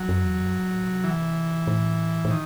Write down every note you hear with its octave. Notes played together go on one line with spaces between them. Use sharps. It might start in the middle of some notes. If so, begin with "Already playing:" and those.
Already playing: F#3
F#2
E2
F#2
G#2
A2
C3
E3
A2
A2
D#3